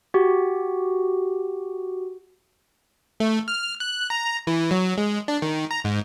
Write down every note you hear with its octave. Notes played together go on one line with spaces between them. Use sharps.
F#4 G4
A3
F6
F#6
A#5
E3
F#3
G#3
D4
D#3
A#5
G#2